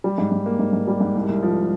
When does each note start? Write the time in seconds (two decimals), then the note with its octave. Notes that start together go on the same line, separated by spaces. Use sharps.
0.04 G3
0.18 G#2
0.32 G#2
0.46 A#3
0.59 G#2
0.73 G#2
0.88 G3
1.01 G#2
1.15 C2
1.29 C2
1.43 F3